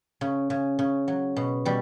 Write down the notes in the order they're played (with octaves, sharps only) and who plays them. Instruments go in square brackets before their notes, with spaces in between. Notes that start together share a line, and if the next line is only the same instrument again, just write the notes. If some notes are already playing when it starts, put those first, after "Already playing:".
[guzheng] C#3
C#3
C#3
F#3
B2
B2 G3